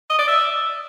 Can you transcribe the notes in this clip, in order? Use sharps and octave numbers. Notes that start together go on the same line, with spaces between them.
D#5
D5
E5